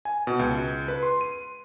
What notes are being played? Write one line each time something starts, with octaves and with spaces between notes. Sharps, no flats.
G#5
B2
C#2
B4
C6
D#7